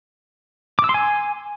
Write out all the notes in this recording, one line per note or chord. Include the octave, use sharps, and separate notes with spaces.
D6
E6
C6
G#5